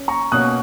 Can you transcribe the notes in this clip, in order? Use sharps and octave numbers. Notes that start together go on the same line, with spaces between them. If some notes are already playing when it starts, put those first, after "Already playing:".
Already playing: C#4
A#5 C#6
B2 A#3 C#4 D#6 F#6